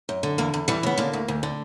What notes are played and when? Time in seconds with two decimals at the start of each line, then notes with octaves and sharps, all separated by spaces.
0.09 F#2
0.23 D3
0.38 E2 A#3
0.54 E2
0.68 E3 G3
0.83 C#3 B3
0.98 D3 A#3
1.13 D2
1.28 D2
1.43 D3